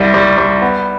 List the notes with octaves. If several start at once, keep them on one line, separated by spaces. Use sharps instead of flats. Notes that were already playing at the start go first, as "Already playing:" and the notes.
Already playing: C2 G3
G3
G3
B3